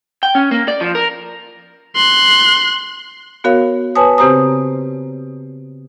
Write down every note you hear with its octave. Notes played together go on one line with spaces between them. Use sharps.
G5
C#4
A#3
D5
F3
A#4
C6 F#6
B3 F#4 A#4 C#5 F5
B4 C#5 G#5 A5 D#6
C#3 C4 G4 C5 A#5 D#6